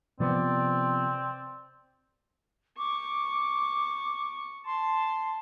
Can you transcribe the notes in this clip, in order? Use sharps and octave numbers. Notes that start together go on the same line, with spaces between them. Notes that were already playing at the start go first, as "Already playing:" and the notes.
C3 F3 B3 C4 D5
C#6 D6
A5 C6